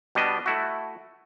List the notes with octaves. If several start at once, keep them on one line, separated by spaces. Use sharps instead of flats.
B2 G3 B3 D4 D#5
A3 E4 F#4